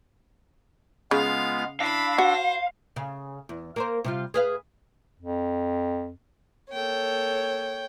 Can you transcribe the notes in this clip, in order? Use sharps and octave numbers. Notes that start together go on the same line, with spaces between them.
C#3 G#3 B3 F4 F5
D4 E4 F5 B5 E6 A#6
F#4 C5
C#3
E2
A#3 A#4 C5
C3 G3 F4
G#4 B4 F5
F2
A#3 A4 C#5 G5